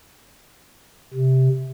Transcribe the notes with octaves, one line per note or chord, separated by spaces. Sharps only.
C3